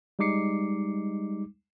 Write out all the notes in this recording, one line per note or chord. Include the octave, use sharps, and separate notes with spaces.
G3 G#3 D#4 D6 C7 C#7